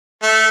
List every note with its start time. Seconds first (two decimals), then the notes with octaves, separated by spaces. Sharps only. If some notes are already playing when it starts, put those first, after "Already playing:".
0.22 A3